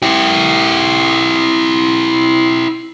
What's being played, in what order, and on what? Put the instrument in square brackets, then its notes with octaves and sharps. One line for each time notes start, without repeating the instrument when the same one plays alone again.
[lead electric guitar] E4 G4